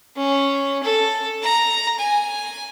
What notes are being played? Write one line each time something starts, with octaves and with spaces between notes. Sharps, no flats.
C#4
A4
A#5
G#5